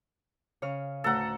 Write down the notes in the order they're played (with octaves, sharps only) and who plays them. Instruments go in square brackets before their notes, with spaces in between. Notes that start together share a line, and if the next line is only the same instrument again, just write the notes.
[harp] C#3 C#5 F6
[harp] D2 A2 A#5 [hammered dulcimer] A4 F#5